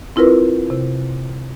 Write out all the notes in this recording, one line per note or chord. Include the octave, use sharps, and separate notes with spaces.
C4 E4 F4 A#4 B4
C3